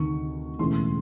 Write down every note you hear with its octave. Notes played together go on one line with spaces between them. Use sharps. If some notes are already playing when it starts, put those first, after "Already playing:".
Already playing: D2 C3 D#3 C#6
E1 E2 C#3 E3 A3 C6